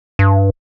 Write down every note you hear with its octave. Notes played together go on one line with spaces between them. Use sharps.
G2